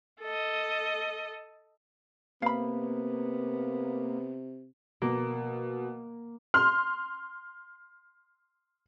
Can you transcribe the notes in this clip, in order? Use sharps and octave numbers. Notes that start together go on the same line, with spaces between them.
A4 D#5
C3 A#3 B3 F5 B5
B2 A#3
C6 F6